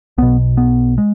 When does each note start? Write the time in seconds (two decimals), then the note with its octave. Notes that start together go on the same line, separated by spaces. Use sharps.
0.18 B1 B2 B3
0.57 B3
0.98 G#3